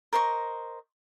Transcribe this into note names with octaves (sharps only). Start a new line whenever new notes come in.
A#4 C5 D#5 C#6